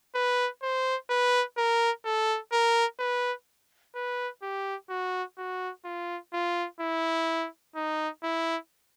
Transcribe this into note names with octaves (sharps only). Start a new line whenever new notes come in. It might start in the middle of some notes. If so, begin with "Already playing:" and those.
B4
C5
B4
A#4
A4
A#4
B4
B4
G4
F#4
F#4
F4
F4
E4
D#4
E4